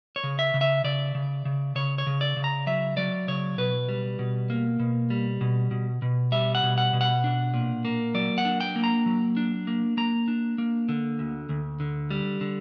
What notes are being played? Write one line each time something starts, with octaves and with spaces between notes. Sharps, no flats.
C#5
C#3
E5
C#3
E5
C#3 D5
C#3
C#3
C#3 C#5
C#5
C#3
D5
C#3
A#5
F#3 E5
F#3 D5
C#3 C#5
B2 B4
G3
B2
A#3
B2
G3
B2
B2
B2
G3 E5
F#5
B2
F#5
B2
F#5
D4
A#2
A#3
F#3 D5
F#5
D4
G5
A#3
A#5
F#3
D4
A#3
A#3 A#5
D4
A#3
D3
D2
D2
D3
G3
D3